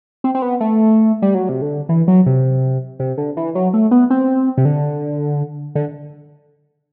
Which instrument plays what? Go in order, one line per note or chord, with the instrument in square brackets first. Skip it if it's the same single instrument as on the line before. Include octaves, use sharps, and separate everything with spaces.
[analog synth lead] C4
C4
B3
A3
G3
F#3
C3
D3
E3
F#3
C3
C3
D3
E3
F#3
A3
B3
C4
C3
D3
D3